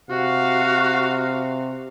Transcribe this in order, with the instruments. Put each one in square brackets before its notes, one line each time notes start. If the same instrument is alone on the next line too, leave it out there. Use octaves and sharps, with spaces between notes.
[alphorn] C3 [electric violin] F#4 [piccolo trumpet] F5